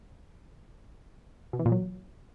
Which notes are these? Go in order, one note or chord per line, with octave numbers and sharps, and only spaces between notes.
B2
E3
A#2
F#3